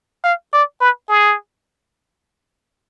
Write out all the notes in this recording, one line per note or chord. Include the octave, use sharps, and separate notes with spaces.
F5
D5
B4
G#4